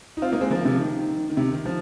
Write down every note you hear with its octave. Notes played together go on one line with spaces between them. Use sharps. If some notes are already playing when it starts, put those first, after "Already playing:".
D#4
C4 F4
A#3 D#4
G#3 C4
F3 A#3
C3 F3
D#3
D#3
C3
D#3
F3